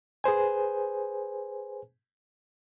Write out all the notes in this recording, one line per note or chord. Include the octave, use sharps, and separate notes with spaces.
G#4 B4 C5 G#5